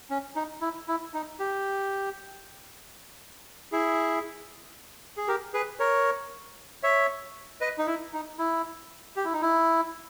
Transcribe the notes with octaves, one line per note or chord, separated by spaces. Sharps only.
C#4
D#4
E4
E4
D#4
G4
E4 G#4
G#4
G4 A#4
G#4 B4
A#4 C#5
C#5 E5
B4 D#5
D#4
E4
D#4
E4
G4
E4
D#4
E4